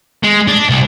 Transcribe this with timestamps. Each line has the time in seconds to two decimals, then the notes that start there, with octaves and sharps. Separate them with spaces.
0.24 G#3
0.48 D4
0.69 C2